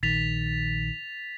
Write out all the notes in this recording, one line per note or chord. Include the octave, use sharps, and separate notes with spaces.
A#1 D#3 A6 B6 F7